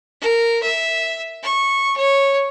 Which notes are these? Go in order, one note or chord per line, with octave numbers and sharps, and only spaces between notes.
A#4
E5
C#6
C#5